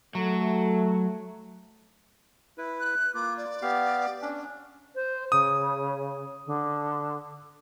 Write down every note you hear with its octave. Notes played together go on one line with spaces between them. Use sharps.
F#3 A3
E4 B4
F#6
A#3 F4 D6
D5
B3 G4 F5
C#4 D4
C5
C#3 D#6
D3